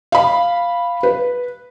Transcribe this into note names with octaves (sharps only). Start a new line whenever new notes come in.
F5 B5
B4